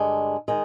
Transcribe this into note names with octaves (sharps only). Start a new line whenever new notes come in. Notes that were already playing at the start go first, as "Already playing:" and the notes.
Already playing: G2 D3 G#3
D#3 G#3